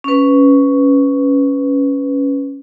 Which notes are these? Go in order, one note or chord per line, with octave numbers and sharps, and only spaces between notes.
C#4 B4